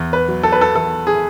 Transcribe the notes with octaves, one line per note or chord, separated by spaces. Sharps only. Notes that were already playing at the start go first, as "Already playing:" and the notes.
Already playing: E2
B4
F#3
A4
B4
A4
E2 A4
G#4